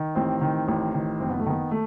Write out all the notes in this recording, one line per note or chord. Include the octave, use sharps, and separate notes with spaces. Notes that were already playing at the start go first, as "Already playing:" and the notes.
Already playing: D#3
A1 C4
D#3
A1
D#3
F#1 C4
B3
A3
D#3 B3
A3